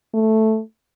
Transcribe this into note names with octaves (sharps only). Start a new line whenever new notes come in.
A3